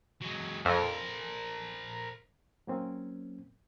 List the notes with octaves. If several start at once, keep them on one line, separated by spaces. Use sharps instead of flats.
F#3 G#3
F2 A#4 C5
F#3 A#3 C4 C#4